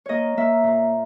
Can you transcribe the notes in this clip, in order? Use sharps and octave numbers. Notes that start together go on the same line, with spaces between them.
A#3 C#5 D#5
A#3 E5
A#2